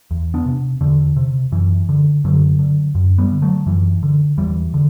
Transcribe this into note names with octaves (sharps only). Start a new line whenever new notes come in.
E2
B3 D4
C3
E2 D3
C3
F#2 E3
D3
F#2 D3 F#3
D3
F#2
G3 B3
D3
F#3 A3
F#2 E3
D3
E2 E3 G3
D3